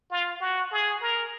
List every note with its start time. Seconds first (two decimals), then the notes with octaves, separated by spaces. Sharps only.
0.11 F4
0.41 F#4
0.72 G#4
1.02 A#4